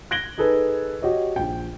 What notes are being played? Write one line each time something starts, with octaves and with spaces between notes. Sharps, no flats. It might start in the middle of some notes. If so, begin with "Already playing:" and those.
F#6 G#6 A#6 D7 F#7 G7
D#4 G#4 A4 B4
F#4 G4 C#5 D#5
A#1 G5